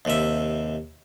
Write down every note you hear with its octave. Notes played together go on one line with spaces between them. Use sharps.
D#2 C3 E5